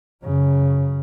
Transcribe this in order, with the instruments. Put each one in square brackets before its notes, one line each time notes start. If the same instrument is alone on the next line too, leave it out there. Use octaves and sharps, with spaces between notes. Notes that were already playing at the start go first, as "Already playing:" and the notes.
[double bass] F#2 C#3